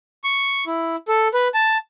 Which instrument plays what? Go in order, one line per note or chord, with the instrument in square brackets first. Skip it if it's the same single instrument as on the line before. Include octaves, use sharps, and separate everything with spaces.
[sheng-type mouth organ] C#6
E4
A4
B4
A5